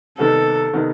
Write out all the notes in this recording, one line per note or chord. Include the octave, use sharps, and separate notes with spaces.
C3 D#3 G3 B3 A4
C3 D#3 G3 B3